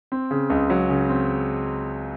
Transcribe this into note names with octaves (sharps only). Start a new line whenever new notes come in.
C4
C#3
C#2
F#3
C#3
C4